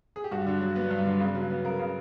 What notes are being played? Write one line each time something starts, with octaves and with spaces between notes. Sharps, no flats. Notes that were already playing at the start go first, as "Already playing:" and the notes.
G#4
G4
G2 F#4
D3
F#3
B3 B4
G2
D3
C#3
F#3
B3
C#3 A#4
C#3